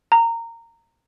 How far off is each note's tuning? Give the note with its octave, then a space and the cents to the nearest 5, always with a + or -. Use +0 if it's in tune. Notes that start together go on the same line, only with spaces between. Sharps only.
A#5 -15